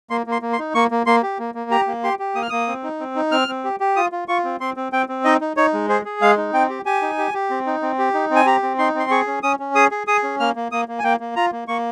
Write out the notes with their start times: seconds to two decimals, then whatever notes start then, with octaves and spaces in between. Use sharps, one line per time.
0.10 A#3 C6
0.26 A#3
0.32 C6
0.42 A#3
0.53 C6
0.58 D#4
0.75 A#3 C#6
0.91 A#3
1.06 A#3 C6
1.23 G4
1.39 A#3
1.55 A#3
1.71 G4 A#5
1.87 A#3
2.03 G4 C6
2.19 G4
2.35 A#3 D#6
2.42 F6
2.50 A#3 D#6
2.68 C4
2.83 D#4
3.00 C4
3.15 D#4
3.32 C4 F6
3.48 C4
3.64 G4
3.80 G4
3.96 F4 D#6
4.12 F4
4.28 F4 C#6
4.45 C4
4.60 C4 C6
4.76 C4
4.92 C4 G5
5.09 C4
5.25 D#4 D#5
5.41 D#4
5.57 D#4 C#5
5.73 G#3
5.89 G#4 C5
6.05 G#4
6.21 G#3 F5
6.37 D#4
6.53 C4 G5
6.70 G4
6.85 G4 G#5
7.02 D#4
7.18 G4
7.34 G4
7.50 C4
7.66 D#4
7.82 C4
7.99 G4
8.14 D#4
8.30 C4
8.36 G#5
8.46 G4 A#5
8.62 C4
8.79 D#4 C6
8.95 C4 C6
9.11 G#4 C#6
9.27 C#4
9.43 C#4 D#6
9.59 C#4
9.75 G#4 D#6
9.91 G#4
10.07 G#4 D#6
10.23 C#4
10.40 A#3 F6
10.56 A#3
10.72 A#3 D#6
10.88 A#3
10.99 G#5
11.04 A#3 G5
11.20 A#3
11.36 F4 A#5
11.52 A#3
11.68 A#3 C#6